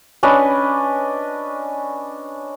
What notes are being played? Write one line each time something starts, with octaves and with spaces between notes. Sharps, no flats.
C#4 D4 B4 D#5